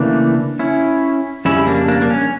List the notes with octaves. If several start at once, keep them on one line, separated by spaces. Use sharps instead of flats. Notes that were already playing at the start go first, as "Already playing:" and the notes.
Already playing: C#3 E3 A3 A#3 D4
C#4 E4
F2 C#3 G3 C#4 E4
A#3 D4
A#3 D4
A#3
C#4